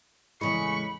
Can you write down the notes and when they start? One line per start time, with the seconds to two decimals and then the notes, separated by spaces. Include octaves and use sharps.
0.41 E2 A2 C#3 G#3 B5 C#6